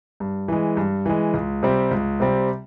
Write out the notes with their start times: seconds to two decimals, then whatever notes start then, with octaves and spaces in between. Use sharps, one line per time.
0.20 G2
0.48 E3 G#3
0.77 G2
1.06 E3 G#3
1.34 C#2
1.63 C3 G3 C4
1.91 C#2
2.20 C3 G3 C4